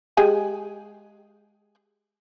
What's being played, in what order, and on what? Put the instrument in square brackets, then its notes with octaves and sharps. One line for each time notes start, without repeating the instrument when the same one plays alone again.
[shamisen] G#3 G4 G#5